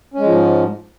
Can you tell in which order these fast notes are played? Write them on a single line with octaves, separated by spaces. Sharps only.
C#4 G#3 F3 G#2